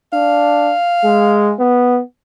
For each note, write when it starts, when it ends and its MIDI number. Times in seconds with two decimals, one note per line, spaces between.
0.13 0.73 62
0.13 1.63 77
1.04 1.53 56
1.59 2.00 59